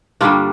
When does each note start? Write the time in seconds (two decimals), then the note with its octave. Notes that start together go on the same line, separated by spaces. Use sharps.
0.21 G2 D3 G3 A#3 D4 F4